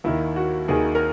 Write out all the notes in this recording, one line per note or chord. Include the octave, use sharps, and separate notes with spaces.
D#2 D#3 E4
F#4
D#2 D#3 G#4
A#4